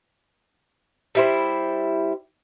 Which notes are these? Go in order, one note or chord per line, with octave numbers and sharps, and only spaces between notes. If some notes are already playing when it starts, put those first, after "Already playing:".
G3 E4 C5